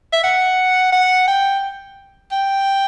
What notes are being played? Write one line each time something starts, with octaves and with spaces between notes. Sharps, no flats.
E5
F#5
F#5
G5
G5